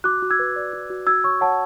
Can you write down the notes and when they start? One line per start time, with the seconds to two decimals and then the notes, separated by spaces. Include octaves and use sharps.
0.04 F#4 D6 F#6
0.22 F#4
0.30 E6 G#6
0.39 B4
0.56 D5
0.73 F#4
0.90 F#4
1.07 F#4 E6 G#6
1.24 C#5 C#6 E6
1.41 C#5 F#5 A5